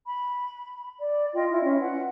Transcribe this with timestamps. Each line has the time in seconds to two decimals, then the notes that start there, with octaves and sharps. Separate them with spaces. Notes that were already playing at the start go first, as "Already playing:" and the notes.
0.06 B5
1.01 D5
1.34 F4 D#5 G5
1.51 E4 F4
1.63 C#4 E5
1.80 B4 F#5